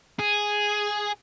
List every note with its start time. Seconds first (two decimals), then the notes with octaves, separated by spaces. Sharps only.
0.19 G#4